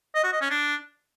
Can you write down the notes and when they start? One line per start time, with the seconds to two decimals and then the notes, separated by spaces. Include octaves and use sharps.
0.15 D#5
0.24 F#4
0.32 D#5
0.41 C#4
0.50 D4